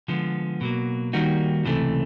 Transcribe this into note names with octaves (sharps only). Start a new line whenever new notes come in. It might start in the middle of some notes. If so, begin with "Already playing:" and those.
D3 F3 G#3 B3
B2 F#3 A#3
D#3 G3 A#3 D#4 F#4
C#2 C3 E3 A3